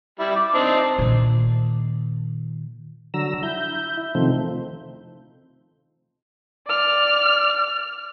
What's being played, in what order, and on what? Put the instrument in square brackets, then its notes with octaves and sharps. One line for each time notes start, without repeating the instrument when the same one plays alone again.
[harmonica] G3 E4
D6
C4 D4 D#4
[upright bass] A#2 D#3
[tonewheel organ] D3 F#3 A#5 E6
E4 G6
C3 D#3 F3 A3 C4
[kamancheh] D5 F6